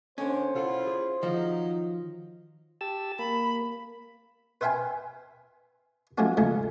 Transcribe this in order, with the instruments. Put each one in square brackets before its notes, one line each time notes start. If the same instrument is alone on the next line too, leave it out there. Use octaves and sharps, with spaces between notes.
[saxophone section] D3 D#3 B3 [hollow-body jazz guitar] C#4 [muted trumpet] C5
[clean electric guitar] B1 A4 F#5 [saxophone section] E4 F4
[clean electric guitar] G#4
[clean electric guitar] D#3 [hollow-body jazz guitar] F3 [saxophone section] F#3 D#4 F5
[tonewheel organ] G4 A5 E6
[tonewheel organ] A#3 [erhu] B5
[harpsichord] B4 C5 E5 F5 G5 G#5
F3 F#3 G#3 A3 C#4 F#4
G#2 C#3 F3 G#3 A3